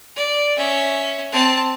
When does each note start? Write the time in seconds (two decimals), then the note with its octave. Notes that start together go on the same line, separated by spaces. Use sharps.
0.16 D5
0.56 C#4 E5
1.32 C4 A5